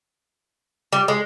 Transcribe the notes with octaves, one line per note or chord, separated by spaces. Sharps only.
G3
G#3